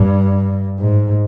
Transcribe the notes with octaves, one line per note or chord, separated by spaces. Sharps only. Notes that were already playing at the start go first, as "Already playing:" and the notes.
Already playing: G2
G#2